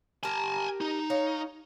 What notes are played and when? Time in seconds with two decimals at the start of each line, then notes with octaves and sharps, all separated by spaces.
0.23 G4 A#4 G#5 A5
0.81 D#4
1.10 C#5 D#5 F5